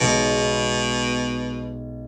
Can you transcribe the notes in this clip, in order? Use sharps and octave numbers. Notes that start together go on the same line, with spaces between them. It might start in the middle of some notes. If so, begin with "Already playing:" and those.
B1 B2 G#3 B3